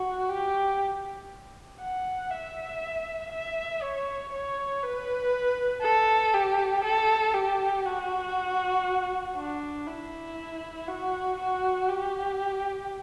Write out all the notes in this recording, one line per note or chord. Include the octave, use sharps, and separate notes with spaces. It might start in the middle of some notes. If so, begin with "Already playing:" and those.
Already playing: F#4
G4
F#5
E5
E5
C#5
C#5
B4
A4
G4
A4
G4
F#4
D4
E4
F#4
F#4
G4